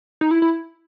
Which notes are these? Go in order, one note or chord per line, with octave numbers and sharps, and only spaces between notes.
D#4
E4
E4